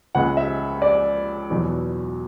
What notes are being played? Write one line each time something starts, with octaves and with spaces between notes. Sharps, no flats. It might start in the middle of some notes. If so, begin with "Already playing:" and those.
C#2 C#3 G#3 F#5
E5
D5
E2 B2 F#3